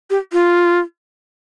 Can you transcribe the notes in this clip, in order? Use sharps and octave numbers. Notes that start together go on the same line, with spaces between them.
G4
F4